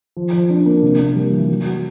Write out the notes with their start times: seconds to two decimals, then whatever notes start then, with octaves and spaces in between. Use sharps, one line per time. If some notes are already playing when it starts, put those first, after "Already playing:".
0.17 F3
0.33 F3
0.50 D4
0.66 A#3
0.82 C3
1.00 A#3
1.16 G3
1.32 E3
1.49 F#3
1.66 F#4